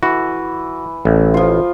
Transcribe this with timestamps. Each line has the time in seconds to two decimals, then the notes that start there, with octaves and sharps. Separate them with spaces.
0.03 E3 F#4
1.05 A1
1.34 F3 F4